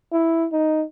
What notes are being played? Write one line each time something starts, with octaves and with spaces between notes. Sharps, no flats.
E4
D#4